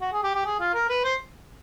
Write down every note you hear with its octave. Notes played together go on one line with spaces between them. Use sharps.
F#4
G#4
G4
G4
G#4
F4
A#4
B4
C5